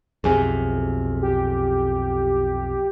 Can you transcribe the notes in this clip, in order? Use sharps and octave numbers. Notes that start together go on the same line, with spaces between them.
B1 F2 C3 G#4 G#5
G4